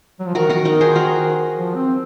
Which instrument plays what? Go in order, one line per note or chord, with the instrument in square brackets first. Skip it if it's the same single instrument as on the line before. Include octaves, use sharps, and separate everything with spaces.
[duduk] F#3
F3
[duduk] D#3 [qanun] F#4 A#4
[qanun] F#4 A#4
D#4 F#4
G#4 C5
F#4 A#4
[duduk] F3
C4